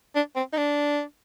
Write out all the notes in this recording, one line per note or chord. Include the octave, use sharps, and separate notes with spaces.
D4
C4
D#4
D4